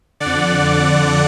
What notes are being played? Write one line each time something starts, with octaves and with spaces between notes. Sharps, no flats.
D3 D5 F#5
F2
F2 D3